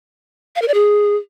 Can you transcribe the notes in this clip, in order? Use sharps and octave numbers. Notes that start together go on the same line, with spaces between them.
F5
A#4
D5
G#4